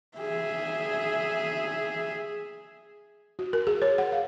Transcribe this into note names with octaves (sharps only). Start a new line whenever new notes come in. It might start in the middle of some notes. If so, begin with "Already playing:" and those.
G#4 E5
F#4
A#4
G#4
C#5
F#5
F5